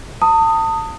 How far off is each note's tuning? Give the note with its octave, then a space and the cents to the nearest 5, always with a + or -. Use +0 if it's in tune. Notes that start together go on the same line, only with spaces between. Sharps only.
A5 +35 D#6 +0